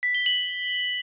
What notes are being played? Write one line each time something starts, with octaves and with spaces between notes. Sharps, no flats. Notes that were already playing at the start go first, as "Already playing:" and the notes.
B6
G7
F#7